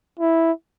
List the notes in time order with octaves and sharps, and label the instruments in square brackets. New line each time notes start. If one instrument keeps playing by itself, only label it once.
[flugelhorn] E4